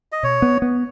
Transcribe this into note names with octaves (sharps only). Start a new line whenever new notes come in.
D#5
B2 C#5
B3
B3